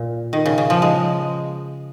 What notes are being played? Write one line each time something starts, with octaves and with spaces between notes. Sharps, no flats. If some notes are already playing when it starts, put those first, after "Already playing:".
Already playing: A#2
D#3
C#3
C#3
F3
G#3